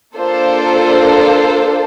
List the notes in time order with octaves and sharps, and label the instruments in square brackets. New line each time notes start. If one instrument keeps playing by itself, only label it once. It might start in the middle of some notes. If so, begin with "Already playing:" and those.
[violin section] A#3 D4 F4 A4 C5